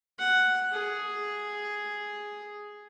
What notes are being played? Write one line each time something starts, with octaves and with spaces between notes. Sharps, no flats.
F#5
G#4